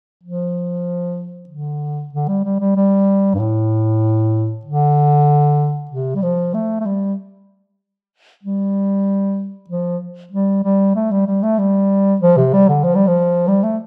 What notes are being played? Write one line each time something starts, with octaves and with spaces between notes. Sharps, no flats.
F3
D3
D3
G3
G3
G3
G3
G2
A2
D3
C3
G3
F3
A3
A3
G3
G3
F3
G3
G3
A3
G3
G3
A3
G3
F3
C3
G3
D3
F3
G3
F3
G3
A3